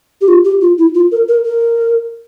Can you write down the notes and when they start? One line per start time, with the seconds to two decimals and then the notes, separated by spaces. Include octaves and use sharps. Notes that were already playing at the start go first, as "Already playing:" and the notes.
0.21 G4
0.28 F4
0.45 G4
0.61 F4
0.78 E4
0.95 F4
1.12 A#4
1.28 A#4
1.45 A#4